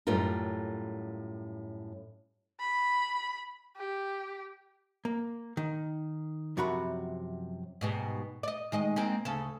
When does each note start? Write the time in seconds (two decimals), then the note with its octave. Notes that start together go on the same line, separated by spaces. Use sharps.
0.07 F#2 A2 G3 F4 A#4
2.60 B5
3.77 G4
5.05 A#3
5.57 D#3
6.57 F#2 C3 F3 F#4 A#4 B5
7.81 G#2 B2 G3
8.43 D5 D#5
8.72 D#3 G#3 D#5
8.96 G#3 A#3 C4
9.25 D2 C#3 A4